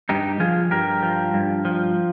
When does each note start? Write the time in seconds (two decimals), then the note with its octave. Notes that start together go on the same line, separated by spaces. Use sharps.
0.09 G2 D#4 G4
0.40 F3 F4 G#4
0.71 G2 G4 A#4
1.02 F3
1.34 G2
1.65 F3